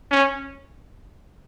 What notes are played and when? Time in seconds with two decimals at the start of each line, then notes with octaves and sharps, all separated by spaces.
0.11 C#4